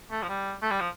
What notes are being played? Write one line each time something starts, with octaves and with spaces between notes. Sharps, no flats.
A3
F3
G3
A3
G3
F3